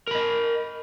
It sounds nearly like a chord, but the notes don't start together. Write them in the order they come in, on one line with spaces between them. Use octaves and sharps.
A#4 B5 D#5